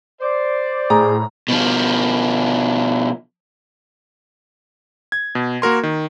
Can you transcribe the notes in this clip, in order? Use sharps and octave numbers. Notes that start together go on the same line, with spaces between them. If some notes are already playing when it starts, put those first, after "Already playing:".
C5 D5
A2 G#4 A#5
B2 F3
G#6
B2
A#3 F#4 A#4 C6
D#3